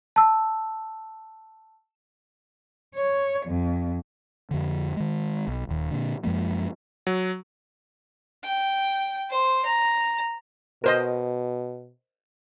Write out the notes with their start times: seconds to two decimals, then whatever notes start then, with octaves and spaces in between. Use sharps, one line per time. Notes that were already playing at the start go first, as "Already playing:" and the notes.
0.16 A5 E6
2.95 C#5
3.46 F2
4.51 F2 D3
4.97 D#3 G#3
5.48 B1
5.69 D#1 D#2
5.91 A#2 D3
6.24 F#2 F3 G#3 A#3
7.07 F#3
8.44 G5
9.30 C5
9.65 A#5
10.84 B2 A#4 C5 D#5